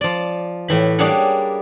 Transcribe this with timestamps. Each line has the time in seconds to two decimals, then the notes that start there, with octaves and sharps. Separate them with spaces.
0.01 F3 D5
0.68 A2 E3 B5
0.99 G3 A#3 D4 G#4 C#5 F#5